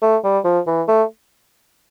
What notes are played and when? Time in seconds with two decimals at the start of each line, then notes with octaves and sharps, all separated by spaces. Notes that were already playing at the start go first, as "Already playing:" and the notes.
0.02 A3
0.24 G3
0.45 F3
0.67 E3
0.88 A3